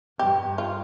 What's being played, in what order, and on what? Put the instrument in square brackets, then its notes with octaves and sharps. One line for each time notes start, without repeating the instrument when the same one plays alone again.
[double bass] G2 [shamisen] G4
[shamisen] F4